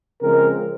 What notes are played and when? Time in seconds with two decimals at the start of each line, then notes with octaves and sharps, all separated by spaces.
0.22 C#3 F3 G#3 C4 A#4